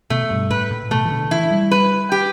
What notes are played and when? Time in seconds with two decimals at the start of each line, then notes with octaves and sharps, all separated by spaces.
0.10 B2 A3
0.30 G2
0.50 A2 B4
0.71 A2
0.91 B2 A3
1.05 E3
1.11 D3
1.31 E3 E4
1.51 G3
1.71 B4
2.12 G4